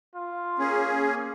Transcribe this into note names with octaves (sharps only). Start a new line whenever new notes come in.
F4
A#3 C#4 G#4